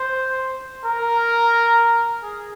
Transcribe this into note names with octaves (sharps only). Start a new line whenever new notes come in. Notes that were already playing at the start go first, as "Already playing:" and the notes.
Already playing: C5
A#4
G#4